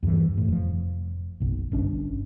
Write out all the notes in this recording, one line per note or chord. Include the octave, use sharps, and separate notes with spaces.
E2 G2 D#3 E3
A2
F1 F3
F#1 B1
G1 C#4 D4